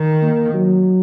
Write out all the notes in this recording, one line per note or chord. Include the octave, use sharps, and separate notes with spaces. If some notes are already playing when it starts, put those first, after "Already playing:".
Already playing: D#3
A#3
F#3